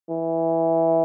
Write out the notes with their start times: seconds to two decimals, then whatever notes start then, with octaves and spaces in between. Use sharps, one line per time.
0.10 E3